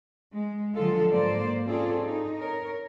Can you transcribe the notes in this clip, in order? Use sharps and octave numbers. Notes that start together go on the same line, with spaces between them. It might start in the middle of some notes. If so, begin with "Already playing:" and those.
G#3
D3 F3 F#3 G#3 F4 A4
G#2 A#3 C5 D5
C4 C#4 F4 G#4 A4 D5
D#4
A#4 C#5